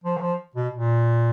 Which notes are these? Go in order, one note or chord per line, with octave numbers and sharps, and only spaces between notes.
F3
E3
F3
B2
A#2